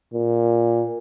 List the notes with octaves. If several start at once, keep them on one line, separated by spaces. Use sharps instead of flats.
A#2